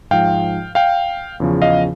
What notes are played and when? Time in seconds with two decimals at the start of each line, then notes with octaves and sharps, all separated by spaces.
0.11 G#2 F3 F5 G5
0.75 F5 G5
1.40 E2 C#3 F3
1.62 D#5 F5